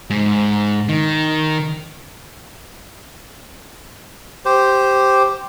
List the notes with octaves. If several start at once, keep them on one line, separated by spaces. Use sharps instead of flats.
G#2
D#3
G4 C5